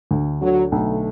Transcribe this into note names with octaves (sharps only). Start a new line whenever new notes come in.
D2
D3 F#3
B1 A3